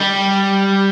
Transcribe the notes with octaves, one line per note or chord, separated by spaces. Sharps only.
G3